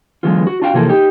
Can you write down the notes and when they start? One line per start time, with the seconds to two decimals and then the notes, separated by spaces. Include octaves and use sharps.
0.23 D3 E3 F#3 G#3 B3 F4
0.47 F#4
0.62 D4 F4 F#4 F5 G5
0.74 C3 E3 F3 A#3 G#4 A4
0.89 D#4 G4